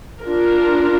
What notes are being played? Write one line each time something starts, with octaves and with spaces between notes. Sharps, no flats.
D4 F4 A#4